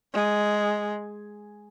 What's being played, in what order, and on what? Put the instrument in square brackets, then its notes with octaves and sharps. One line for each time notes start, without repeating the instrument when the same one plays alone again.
[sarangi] G#3